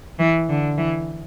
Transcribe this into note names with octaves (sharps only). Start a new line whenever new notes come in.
E3
D3
E3